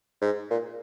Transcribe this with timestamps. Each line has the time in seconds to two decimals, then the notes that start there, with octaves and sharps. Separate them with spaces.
0.22 G#2
0.50 A#2